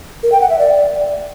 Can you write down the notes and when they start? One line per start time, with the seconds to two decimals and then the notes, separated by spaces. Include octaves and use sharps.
0.23 A#4
0.32 G5
0.41 F#5
0.50 E5
0.59 D5